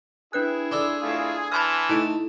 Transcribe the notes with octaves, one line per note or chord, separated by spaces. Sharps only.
D4 E4 G#4 B4 F#6
D4 A4 C6 D6
A3 E4 F4
E3 A5 B5 C6 F6
A3 D#4 E4 D7